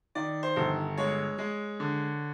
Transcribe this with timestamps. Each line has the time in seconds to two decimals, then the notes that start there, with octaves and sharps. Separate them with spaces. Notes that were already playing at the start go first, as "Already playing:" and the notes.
0.15 D#3 D5
0.43 C5
0.56 G1
0.97 G#3 C#5
1.38 G#3
1.80 D3